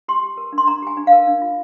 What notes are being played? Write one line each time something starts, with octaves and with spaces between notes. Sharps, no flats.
G4 C6
G4
A#4
D4
C6
D4 A#5
G4 G#5
D4
F5
A#4
D4
F4